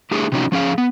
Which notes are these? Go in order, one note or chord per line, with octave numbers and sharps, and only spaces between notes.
A3 D4 E4 G4 G#4
C3 F3 C#4 D#4 F#4
F3 C#4 G#4 F5
B3